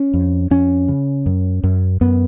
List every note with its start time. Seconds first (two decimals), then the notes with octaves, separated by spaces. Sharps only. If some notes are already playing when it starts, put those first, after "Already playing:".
Already playing: C#4
0.14 F2
0.51 F2 C#4
0.88 C#3
1.26 F#2
1.64 F#2
2.01 F#2 B3